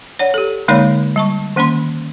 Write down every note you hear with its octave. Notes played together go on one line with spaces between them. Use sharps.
C#5 D5 F#5
G4 A4
D3 G#3 A#3 D#4 C#5 D5
G3 A5 C#6
D#3 A#3 C#4 B5 C6